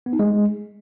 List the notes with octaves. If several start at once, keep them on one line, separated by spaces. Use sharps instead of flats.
B3
D#4
G#3